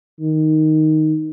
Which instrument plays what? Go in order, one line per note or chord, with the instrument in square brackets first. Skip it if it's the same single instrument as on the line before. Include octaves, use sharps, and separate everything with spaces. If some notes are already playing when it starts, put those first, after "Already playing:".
[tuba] D#3